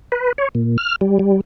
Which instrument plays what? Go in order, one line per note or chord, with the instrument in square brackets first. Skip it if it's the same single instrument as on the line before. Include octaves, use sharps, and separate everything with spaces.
[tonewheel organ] B4
C#5
A#2
F6
G3
G3